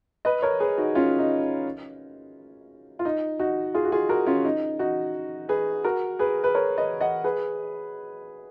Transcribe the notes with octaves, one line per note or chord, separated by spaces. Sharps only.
B4 D#5
A#4 C#5
G#4 B4
D#4 F#4
C#4 F4
D#4
F4
D#4
D#4 F#4
F4 G#4
F#4
F4 G#4
F#4 A#4
C#4 F4
D#4
D#4 F#4
G#4 B4
F#4 A#4
G#4 B4
B4
A#4 C#5
B4 D#5
D#5 F#5
G#4 B4